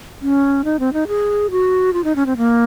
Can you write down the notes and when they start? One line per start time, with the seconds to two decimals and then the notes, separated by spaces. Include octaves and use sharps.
0.22 C#4
0.64 D#4
0.79 C4
0.93 D#4
1.08 G#4
1.51 F#4
1.93 F4
2.04 D#4
2.16 C#4
2.26 C4
2.37 A#3